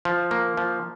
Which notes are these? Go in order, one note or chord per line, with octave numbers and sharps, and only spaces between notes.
F3
A#3
F3